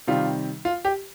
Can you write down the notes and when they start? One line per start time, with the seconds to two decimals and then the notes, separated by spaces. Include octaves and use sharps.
0.07 C3 D#3 G3 F4
0.65 F4
0.85 G4